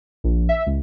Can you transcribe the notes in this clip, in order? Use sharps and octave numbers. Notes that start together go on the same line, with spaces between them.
A#1
E5
C#2